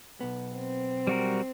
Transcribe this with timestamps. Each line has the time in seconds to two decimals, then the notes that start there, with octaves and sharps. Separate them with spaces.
0.21 B1 B3
0.56 C4
1.07 G3 F#4 A#4